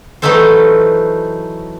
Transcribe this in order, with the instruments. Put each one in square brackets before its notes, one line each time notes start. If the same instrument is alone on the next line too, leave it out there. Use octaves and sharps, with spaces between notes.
[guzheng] E3 F#3 A3 D#4 A4 C5